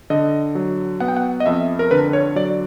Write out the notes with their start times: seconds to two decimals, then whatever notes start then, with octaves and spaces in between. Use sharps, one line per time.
0.10 D3 D#5
0.55 F#3
1.00 B3 F#5
1.08 G5
1.17 F#5
1.40 D#5
1.46 F2 E5
1.79 A#4
1.91 D3 B4
2.13 C#5
2.36 F#3 D5